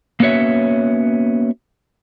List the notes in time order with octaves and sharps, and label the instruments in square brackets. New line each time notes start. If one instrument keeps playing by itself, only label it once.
[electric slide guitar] A#3 B3 C#4 F#4 C#5 E5